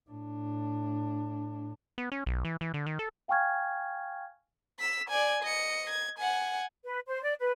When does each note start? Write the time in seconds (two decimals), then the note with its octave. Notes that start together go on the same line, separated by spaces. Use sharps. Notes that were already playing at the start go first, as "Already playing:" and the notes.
0.10 A2 D4
1.98 B3
2.12 C#4
2.26 B1
2.45 E3
2.61 E3
2.74 D3
2.86 D#3
2.99 A4
3.28 F5 G5 G#5 C#6 F6 G#6
4.79 E6 B6
5.10 D5 G#5
5.43 D#5 C#7
5.90 G#6
6.19 F#5 G#5
6.84 B4
7.07 C5
7.23 D5
7.40 B4